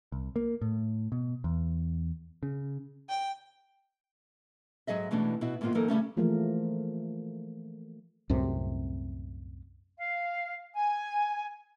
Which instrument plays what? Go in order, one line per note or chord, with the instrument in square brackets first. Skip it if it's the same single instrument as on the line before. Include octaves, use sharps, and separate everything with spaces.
[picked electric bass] C2
A#3
A2
B2
E2
C#3
[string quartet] G5
[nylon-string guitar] G#2 F#3 G#4 D#5 E5
B2 E3 G#3 A3 C#4 D4
B2 E4 F#4
G#2 B2 D#3 A#3 B3 F4
E3 F#3 A#3 D#4 A4 A#4
C#3 G3 A3 C#4
[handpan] E3 F3 A3 A#3 G#4 A#4
[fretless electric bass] C2 F#2 A2 C3
[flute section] F5
G#5